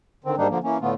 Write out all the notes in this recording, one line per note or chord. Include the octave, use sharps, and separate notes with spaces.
D3 D#3 C4
G#2 G3 A#3 D4 D#4
D3 F3 A#3
E3 A#3 C#4
A2 D3 A3 B3 F4